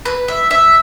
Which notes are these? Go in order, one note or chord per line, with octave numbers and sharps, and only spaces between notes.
B4
E5
E5